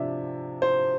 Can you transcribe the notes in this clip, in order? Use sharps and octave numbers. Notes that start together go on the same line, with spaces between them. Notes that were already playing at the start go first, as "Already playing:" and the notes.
Already playing: C3 F3 D4 D5 E5
C5